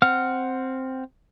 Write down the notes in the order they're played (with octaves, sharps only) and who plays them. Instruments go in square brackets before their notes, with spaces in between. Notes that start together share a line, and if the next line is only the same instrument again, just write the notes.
[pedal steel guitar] C4 F#5 F6